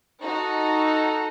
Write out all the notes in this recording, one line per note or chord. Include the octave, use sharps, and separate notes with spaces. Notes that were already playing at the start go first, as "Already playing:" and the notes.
D#4 F#4 A4